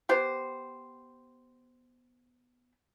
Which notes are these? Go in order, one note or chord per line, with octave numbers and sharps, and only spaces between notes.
B3 G4 C5